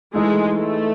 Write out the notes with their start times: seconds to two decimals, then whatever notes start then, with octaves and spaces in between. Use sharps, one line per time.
0.14 E3 G#3 A3 D#4 A4
0.58 A3